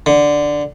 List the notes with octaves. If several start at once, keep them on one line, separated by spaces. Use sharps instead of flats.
D3